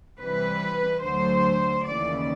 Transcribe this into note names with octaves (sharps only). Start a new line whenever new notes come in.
C3 E3 G3 B4
D2 D3 F#3 A3 C5
D#2 C#3 E3 D5